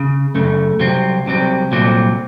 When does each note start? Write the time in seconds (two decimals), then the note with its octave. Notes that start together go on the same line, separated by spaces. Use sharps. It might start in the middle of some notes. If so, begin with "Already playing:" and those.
Already playing: C#3
0.35 F#2 C#3 A3
0.80 C2 C3 F#3 C4
1.26 C2 C3 F#3 C4
1.71 C2 A#2 F#3 C4